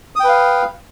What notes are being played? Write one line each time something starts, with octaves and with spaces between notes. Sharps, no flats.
B4 F5 G5 D#6